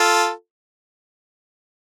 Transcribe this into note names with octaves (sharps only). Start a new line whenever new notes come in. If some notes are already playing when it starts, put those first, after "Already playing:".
Already playing: F4 A4